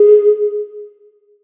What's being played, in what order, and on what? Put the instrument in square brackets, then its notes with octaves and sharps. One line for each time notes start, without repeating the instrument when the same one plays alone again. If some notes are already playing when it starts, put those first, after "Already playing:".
Already playing: [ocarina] G#4